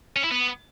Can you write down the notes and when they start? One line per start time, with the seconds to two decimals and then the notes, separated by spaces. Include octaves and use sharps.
0.16 C#4
0.24 E4
0.31 B3